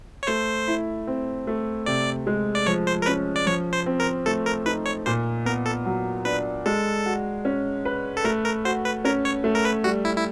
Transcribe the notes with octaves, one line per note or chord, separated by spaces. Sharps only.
C#5
A3 C5
E4
C4
A3
C3 D5
G#3
D5
F3 C#5
C5
A#4
C#4 B4
D5
F3 C#5
C5
C4
A#4
A3 A4
A#4
D#4 B4
C#5
A#2 C5
B3 A#4
A4
F#3
D4 B4
G#3 A4
F#4
C#4
B4
A4
A3 A#4
A#4
F#4 C5
B4
C#4 A#4
C#5
A3
A#4
B4
G3 F#4
E4
E4